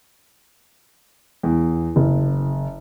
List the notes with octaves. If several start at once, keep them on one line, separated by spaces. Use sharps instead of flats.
E2
F#1